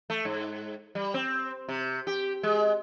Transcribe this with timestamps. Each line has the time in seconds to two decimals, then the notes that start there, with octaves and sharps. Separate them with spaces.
0.10 A3
0.25 G#2
0.95 G3
1.14 C4
1.69 C3
2.07 G4
2.43 G#3